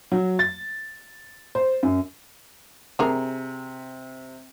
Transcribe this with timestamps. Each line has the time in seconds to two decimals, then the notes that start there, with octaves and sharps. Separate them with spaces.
0.12 F#3
0.39 A6
1.55 C5
1.83 F#2
2.99 C3 D4 G#4 A#4